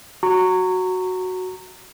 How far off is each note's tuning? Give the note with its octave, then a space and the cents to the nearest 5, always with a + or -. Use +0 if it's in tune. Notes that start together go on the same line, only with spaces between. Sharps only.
F#4 +0 A#5 -25 C#6 +0